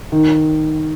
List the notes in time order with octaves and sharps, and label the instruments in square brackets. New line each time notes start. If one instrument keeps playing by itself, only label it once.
[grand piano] D#3